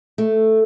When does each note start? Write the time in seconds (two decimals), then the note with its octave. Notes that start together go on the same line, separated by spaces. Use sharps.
0.18 A3